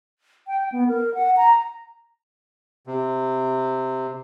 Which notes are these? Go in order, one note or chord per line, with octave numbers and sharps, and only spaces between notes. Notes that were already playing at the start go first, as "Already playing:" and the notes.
G5
B3
A#4
F#5
A#5
C3